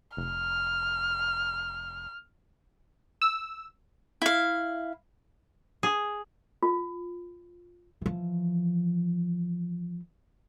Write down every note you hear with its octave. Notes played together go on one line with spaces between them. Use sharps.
F1 F6
E6
E4 F5
G#4
F4
E3 F3